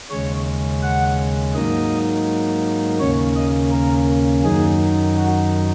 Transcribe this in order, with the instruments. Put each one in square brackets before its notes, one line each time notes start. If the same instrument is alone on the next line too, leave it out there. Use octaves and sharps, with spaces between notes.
[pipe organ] D#2 C#3 G#3 C#4 C#5
F#5
G#2 F#3 A#3 D#4 D#5
D#2 C#3 A#3 C#4 C#5
D#5
A#4
F#2 D#3 F#3 D#4 G#4
F#4